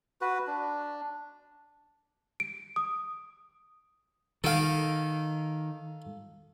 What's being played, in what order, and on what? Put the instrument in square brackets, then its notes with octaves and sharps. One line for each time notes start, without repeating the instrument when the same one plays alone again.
[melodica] F#4 B4
D4
[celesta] D7
D#6
[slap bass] D#3 [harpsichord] A4 F5